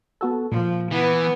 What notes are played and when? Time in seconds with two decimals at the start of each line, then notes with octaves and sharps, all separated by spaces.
0.21 B3 F#4 A4
0.52 A#2 F3
0.91 E3 B3